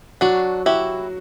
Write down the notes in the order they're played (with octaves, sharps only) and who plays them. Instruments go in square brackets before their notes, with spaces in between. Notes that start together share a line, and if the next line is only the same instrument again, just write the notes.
[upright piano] F#3 [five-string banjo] D4 F#4
[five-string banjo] E4 G4 [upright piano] F#4